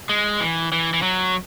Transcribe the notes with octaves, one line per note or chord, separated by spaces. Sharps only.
G#3
E3
E3
E3
F#3